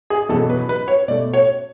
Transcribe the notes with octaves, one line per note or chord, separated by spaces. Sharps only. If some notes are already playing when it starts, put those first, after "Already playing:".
G#4
E2 B2 F#3 B3 A4
B4
B4
C#5
B2 A3 D5
C#5